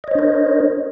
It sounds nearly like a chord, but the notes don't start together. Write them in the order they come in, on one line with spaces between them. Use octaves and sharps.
D#5 C#5 C5 D4 A#4